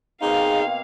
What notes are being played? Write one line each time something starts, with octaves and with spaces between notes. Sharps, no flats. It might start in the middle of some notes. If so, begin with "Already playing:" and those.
B2 A#3 C4 D#4 G#4 F5